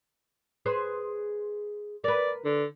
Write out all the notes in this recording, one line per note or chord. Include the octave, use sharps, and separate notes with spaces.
G#4 B4 C5
A#4 B4 D5
D3